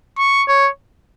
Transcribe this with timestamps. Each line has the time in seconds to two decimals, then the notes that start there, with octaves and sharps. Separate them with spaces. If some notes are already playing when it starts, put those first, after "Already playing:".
0.18 C#6
0.48 C#5